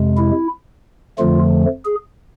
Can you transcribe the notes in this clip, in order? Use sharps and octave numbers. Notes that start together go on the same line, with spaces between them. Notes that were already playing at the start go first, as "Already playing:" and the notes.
Already playing: F2 C3 G#3
E4
F2 D3 F3 A3 F4
G#4